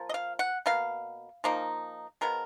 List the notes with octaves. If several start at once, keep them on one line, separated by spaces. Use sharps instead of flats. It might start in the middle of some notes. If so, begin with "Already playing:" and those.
Already playing: F3 A#3
D#5
F5
F#5
B2 A#3 F5
F3 A#3 D#4
F3 G#3 B3 A#4